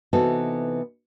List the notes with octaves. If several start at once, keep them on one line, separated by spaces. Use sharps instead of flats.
C3 E3 B3 D#4 F#4 A4